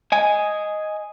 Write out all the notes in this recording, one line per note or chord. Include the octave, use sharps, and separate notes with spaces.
D#5 G#5